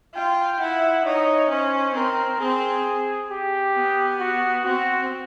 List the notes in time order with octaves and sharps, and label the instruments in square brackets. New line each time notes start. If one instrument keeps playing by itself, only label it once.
[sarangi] F4 [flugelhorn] G5
[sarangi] E4 [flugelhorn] F#5
[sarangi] D#4 [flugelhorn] C#5
[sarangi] C#4 [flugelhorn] C5
[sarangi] C4 [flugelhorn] A#4
[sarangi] C4 [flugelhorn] G#4
[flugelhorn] G4
[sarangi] B3
[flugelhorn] F#4
[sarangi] C4 [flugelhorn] F#4